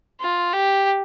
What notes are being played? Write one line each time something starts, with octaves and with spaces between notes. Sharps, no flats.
F4
G4